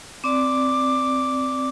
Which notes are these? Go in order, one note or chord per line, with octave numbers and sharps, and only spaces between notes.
C4 D5 D6